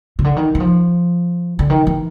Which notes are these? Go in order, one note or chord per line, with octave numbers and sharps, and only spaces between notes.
C#3
D3
D#3
E3
F3
D3
D#3
E3